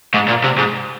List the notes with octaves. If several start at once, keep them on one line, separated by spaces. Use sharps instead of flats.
G#2
A#2
C3
G#2